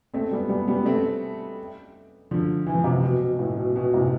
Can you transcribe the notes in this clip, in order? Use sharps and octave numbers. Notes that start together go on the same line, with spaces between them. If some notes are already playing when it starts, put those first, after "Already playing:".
A3 C4
G3 B3
G3 B3
G3 B3
A3 C4
D3 F3
E3
F3
C3 E3
B2
B2
B2
A2
B2
B2
A2 C3